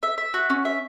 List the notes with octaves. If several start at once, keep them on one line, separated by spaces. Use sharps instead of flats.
E5
E5
F#4
C#4
E5